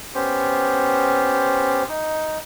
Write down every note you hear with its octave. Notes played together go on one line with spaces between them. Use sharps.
B3 C#4 G4 C5
D#4